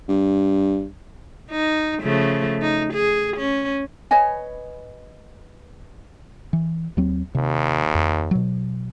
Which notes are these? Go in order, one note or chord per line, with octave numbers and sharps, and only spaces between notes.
G2
D#4
C#3 F3 A3
D#4
G#4
C#4
B4 C#5 D#5 G#5
E3
D#2 F#3 C4
D#2 C3
F2
B2 F#3